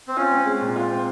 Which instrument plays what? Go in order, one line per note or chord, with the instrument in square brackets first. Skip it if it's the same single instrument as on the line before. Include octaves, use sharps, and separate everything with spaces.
[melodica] C4
[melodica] C#4 [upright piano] F4
[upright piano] C4
G#3
A#2
F4
C4